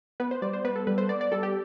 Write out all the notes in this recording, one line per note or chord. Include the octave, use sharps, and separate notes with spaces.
B3 B4
C5
G3 D5
C5
B3 B4
A4
G3 B4
C5
B3 D5
D5
G3 A4
G4